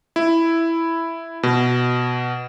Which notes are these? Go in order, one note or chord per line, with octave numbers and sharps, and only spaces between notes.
E4
B2